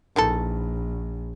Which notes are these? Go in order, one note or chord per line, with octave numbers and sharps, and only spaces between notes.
A#1 D#3 E3 A4